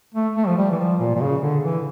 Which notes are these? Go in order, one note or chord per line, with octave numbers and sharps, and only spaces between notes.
A3
A3
F3
G3
E3
F3
A#2
A#2
C#3
D3
E3